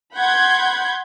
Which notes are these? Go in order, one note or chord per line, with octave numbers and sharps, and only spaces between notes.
F#5 B5 C6 G6 G#6